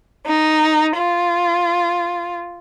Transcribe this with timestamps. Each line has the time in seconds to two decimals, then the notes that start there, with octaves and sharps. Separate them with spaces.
0.25 D#4
0.96 F4